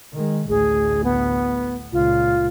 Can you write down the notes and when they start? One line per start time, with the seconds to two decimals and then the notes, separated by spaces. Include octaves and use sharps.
0.13 D#3 G#3
0.49 A1 D2 G#4
1.04 B3
1.93 C#2 A#2 F4